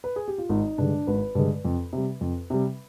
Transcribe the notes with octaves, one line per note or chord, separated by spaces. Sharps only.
B4
G#4
G4
F4
G#1 D#4
G2 D3 G#3 D4
G#1 B4
G2 D3 G#3
F2
C3 G3
F2
C3 G3